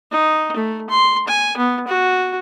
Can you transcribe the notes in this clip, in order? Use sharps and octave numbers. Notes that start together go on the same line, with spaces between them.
D#4
A3
C6
G#5
B3
F#4